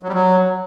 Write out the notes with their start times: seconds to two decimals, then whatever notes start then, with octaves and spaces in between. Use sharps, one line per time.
0.03 F#3
0.08 G3
0.14 F#3